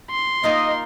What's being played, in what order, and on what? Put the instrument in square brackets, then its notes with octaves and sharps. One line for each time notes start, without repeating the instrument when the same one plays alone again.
[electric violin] C6
[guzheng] A#3 D#4 F4 [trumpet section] D#5